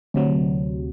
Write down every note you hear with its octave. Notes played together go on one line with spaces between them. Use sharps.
D2 C3 F#3